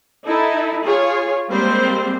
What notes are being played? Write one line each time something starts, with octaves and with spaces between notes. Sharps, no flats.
D#4 E4 A4
F4 G#4 C#5
G3 G#3 A#3 C4 C5